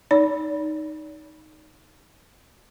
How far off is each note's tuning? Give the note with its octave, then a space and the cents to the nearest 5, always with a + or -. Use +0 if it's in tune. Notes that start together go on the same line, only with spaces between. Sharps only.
D#4 +0 D5 -40